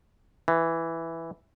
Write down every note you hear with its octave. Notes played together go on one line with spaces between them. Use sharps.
E3